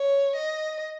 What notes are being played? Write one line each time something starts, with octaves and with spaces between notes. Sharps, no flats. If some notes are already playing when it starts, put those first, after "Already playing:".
Already playing: C#5
D#5